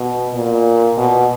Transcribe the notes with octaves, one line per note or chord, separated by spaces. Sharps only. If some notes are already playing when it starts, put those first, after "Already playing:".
Already playing: B2
A#2
B2